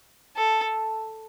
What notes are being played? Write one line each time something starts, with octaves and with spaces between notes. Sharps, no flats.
A4